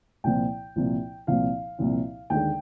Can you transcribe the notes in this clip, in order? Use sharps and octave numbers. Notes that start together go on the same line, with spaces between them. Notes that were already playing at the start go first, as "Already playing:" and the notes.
C2 A#2 F3 C4 G5
C2 A#2 F3 C4
C2 A#2 F3 C4 F5
C2 A#2 F3 C4
D#2 D3 G#3 G5